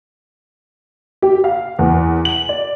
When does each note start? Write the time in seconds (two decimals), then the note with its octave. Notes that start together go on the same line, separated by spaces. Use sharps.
1.22 G4
1.44 F5
1.79 E2
2.25 F#7
2.49 D5